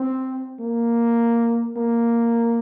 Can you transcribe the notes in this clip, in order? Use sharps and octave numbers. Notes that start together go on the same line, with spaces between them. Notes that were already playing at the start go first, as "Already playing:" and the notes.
Already playing: C4
A#3
A#3